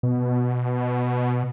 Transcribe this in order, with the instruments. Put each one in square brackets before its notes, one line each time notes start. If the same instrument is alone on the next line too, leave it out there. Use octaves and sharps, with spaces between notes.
[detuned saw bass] B2